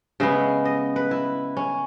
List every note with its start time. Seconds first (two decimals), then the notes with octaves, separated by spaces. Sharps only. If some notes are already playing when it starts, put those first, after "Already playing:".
0.20 C#3 G#3 B3 E5
0.65 D#5
0.96 B4
1.11 E4
1.57 C#4